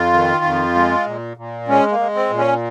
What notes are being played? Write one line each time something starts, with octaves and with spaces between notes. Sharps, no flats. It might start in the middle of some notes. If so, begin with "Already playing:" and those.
Already playing: F2 F4
D#3
F2
G#3
A#2
A#2
G#3 C#4
A#3
G#3
C4
A#2
C#4